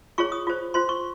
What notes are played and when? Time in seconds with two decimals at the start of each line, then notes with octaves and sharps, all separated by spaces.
0.18 F4 G#4 C#5 C#6
0.32 D#6
0.47 F4 C5
0.74 F4 C5 C6
0.89 C#6